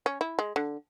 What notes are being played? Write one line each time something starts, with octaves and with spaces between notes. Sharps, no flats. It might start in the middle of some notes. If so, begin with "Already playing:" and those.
C#4
E4
G#3
D3